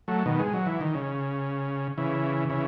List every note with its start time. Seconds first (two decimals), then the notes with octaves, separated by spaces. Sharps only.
0.08 F#3 A3
0.26 B2 D#3
0.40 G#3
0.54 F#3
0.66 E3
0.81 D#3
0.94 C#3
1.98 C#3 E3
2.50 C#3 E3